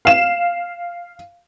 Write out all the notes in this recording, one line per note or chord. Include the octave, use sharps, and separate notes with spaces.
F5 E7